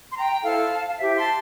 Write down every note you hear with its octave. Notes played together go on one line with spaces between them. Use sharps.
C6
G5 A#5
E4 A4 C5 F5 A5
F5
E4 G4 C5 E5
A5 C6